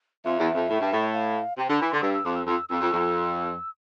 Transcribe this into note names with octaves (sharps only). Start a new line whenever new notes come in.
F2 E5
E2
F2
A2
G2
A2
F5
C3 G5
D3 A5
E3 B5
D3 C6
G2 E6
E6
F2 D6
E6
F2 E6
F2 E6
F2
F2